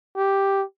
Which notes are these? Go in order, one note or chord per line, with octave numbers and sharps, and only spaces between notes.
G4